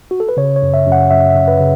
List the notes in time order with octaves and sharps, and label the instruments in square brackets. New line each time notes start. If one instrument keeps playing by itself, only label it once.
[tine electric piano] F#4
A4
B4
C#3 C#5
C#5
F#2
E5
F#2
F#5
F#2 E5
E5
F#2
B4
C#3